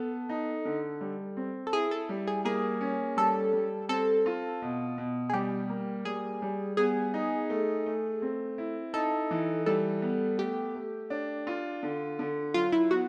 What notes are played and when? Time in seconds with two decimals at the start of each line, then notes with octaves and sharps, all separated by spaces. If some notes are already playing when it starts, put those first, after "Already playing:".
Already playing: B3 A4
0.29 D#4
0.65 D3
1.01 G3
1.37 C4
1.67 A4
1.73 E4 G#4
1.91 A4
2.09 G3
2.27 G#4
2.45 A#3 G#4
2.81 C#4
3.17 G3 A4
3.53 G3
3.89 C4 A4
4.26 F4
4.62 B2
4.98 B2
5.30 G#4
5.33 G3 G4
5.69 A#3
6.05 G3 G#4
6.42 G3
6.77 B3 G#4
7.14 D#4
7.50 A3
7.86 A3
8.22 C4
8.58 E4
8.93 D#4 A4
9.31 E3
9.66 G3 A4
10.02 B3
10.38 A3 G4
10.75 A3
11.10 D4
11.47 F4
11.83 D3
12.19 D3
12.54 F#3 F4
12.72 E4
12.91 B3 F#4